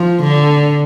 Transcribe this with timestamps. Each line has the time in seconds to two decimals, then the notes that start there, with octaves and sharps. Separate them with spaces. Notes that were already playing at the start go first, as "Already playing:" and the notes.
Already playing: F3
0.23 D3